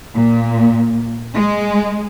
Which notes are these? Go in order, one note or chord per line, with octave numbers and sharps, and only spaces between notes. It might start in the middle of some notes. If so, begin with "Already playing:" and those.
A#2
G#3